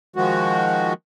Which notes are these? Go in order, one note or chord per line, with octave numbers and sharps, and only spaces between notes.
D#3 F3 G#3 F#4